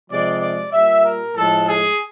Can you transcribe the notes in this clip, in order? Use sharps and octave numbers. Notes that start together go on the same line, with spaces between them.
C3 F3 G#3 D5
D5
A#2 G3 E5
A#4
A2 F3 G#3 A4
G#4